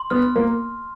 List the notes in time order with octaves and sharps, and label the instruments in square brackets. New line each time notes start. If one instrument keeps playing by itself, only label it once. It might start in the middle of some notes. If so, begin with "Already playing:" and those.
Already playing: [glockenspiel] C6
[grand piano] B3 [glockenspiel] F6
[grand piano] A#3